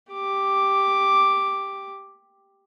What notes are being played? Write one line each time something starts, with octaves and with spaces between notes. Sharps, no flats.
G4 D6